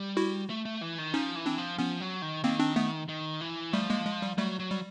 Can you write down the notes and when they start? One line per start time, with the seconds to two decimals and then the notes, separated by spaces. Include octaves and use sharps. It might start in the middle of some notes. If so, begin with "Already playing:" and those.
Already playing: G3
0.17 E4 F#4
0.50 A3
0.65 A3
0.81 E3
0.98 D#3
1.14 F3 C#4 D#4
1.35 E3
1.46 C4 D4
1.58 F3
1.78 F3 B3 C#4
2.01 F#3
2.22 D#3
2.44 D#3 A#3 C4
2.60 C4 D4
2.76 A3 B3
3.09 D#3
3.41 E3
3.73 F3 G3 A3
3.90 G#3 A#3
4.06 G#3
4.22 G3
4.38 F#3 G3 A3
4.60 F#3
4.71 G3